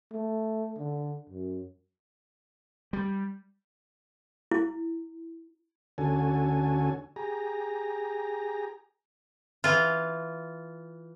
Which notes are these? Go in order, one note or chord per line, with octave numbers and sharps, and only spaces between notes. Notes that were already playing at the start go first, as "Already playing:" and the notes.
A3
D3
F#2
G3
E4
D2 D3 C#4 F#4 A4 G#5
G4 G#4 A#5
E3 F4